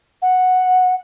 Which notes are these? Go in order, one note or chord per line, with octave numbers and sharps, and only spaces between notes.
F#5